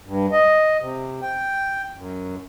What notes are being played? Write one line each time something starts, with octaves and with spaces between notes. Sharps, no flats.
G2
D#5
C3
G5
F#2